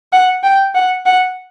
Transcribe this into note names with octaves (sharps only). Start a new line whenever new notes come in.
F#5
G5
F#5
F#5